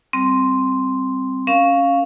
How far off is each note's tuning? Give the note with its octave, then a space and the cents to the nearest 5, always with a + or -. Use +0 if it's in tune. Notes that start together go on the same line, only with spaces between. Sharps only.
G3 +0 C4 +0
C#4 +0 A#4 +10 F5 +0